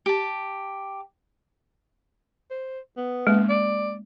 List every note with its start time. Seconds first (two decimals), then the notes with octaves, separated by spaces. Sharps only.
0.06 G4 A5
2.51 C5
2.97 B3
3.27 G#3 A#3 C#4
3.49 D5